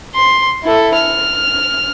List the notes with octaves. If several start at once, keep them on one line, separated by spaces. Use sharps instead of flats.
C6
E4 A4
F6